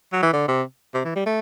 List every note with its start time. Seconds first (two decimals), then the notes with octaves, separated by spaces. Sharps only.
0.13 F#3
0.23 E3
0.33 D3
0.48 C3
0.94 C3
1.05 E3
1.16 G3
1.26 A3